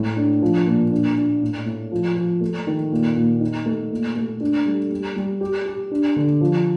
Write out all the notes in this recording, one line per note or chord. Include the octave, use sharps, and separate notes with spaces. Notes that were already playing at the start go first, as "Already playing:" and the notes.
Already playing: A2
D4
F3
A#2
D4
D4
A2
A2
F3
F3
A3
D#3
A#2
A#2
D#4
A3
A#2
A3
D4
G3
G3
G3
G4
G4
D4
D3
F3